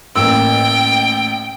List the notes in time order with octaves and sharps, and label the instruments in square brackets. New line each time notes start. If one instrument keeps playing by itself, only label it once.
[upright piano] A1 A#3 E6 [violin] G5